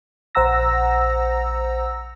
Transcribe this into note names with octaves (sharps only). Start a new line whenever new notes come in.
A#1 C5 F#5 A#5 E6 A#6